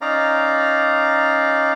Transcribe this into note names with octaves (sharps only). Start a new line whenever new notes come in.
C#4 D#4 D5 F5 A#5